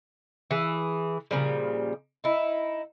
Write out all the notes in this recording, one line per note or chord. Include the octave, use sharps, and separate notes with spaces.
E3 G#4
A#2 C#3 F3 G3
D#4 E4